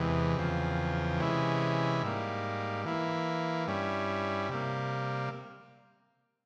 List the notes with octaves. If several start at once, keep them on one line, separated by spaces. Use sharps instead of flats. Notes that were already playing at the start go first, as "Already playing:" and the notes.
Already playing: E2 C3 E3 G#3
E2 C#3 F3 C4
C3 E3 G#3 C#4 E4
G#2 G3 A#3
E3 A#3 E4
G2 G3 C#4 E4
C3 G3 A#3